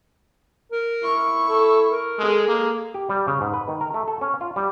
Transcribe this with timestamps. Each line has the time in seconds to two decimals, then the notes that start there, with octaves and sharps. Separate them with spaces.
0.72 A#4
1.04 E4 C#6
1.49 A4
1.90 A#4
2.19 G#3 G#4 A4
2.48 A#3
2.94 G4
3.09 G3
3.27 C#3
3.41 G#2
3.54 B4
3.68 D#3
3.81 A#4
3.94 A3
4.08 A4
4.21 C#4
4.41 F4
4.56 G3